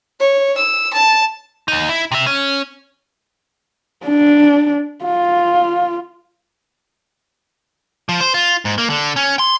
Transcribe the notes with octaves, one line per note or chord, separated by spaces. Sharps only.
C#5
E6
A5
D#2 D#4
E4
C3 E5
C#4
D4
F4
F3
C5
F4
G#2
A#3
D3
C#4
C6